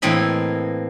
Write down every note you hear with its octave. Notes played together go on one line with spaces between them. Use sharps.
A2 E3 A#3 C4 D#5 B5